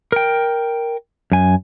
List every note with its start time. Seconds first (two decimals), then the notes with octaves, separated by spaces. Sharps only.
0.12 A#4 G5
1.32 F#2 G#5